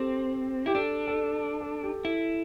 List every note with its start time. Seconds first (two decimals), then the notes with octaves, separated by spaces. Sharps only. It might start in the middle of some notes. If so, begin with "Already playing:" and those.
Already playing: C4 G4 A4 C5
0.66 E4 G4
0.75 D4 A4
1.08 A4
1.61 A4
1.83 G4
2.04 E4 A4